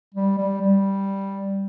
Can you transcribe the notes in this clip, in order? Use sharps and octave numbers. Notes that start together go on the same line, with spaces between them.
G3
G3
G3